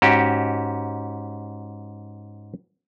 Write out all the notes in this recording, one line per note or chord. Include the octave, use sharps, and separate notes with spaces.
G#2 C#4 F#4 G4 G5